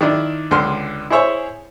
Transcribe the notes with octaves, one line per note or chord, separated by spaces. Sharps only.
D#3 D4 E4
C#2 D3 C6 F6
E4 G#4 C5 C#5 E5